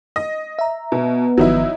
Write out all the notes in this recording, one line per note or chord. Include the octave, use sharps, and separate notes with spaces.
D#5
E5 A#5
B2 B3
G1 D#3 F3 F#3 D#4 E4